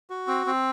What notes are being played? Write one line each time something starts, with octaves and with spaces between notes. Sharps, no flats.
F#4
C4
C4